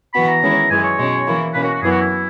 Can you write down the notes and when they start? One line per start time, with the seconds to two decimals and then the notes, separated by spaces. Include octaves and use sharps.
0.14 E3 B3 F#4 B5
0.28 A#5
0.43 D#3 G#3 C#4 E4
0.70 F#2 E3 G#3 G#5
0.84 C#5
0.99 B2 G#3 C#4
1.27 E3 A#3 E4
1.54 B2 A#3 C#4 B4
1.64 F#4
1.74 F#4
1.82 F#2 E3 B3 G#4
1.91 F#4
2.01 E4